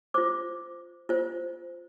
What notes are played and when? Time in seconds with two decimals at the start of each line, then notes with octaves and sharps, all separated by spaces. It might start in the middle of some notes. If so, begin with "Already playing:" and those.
0.14 F4 C5 D6
1.09 F4 C5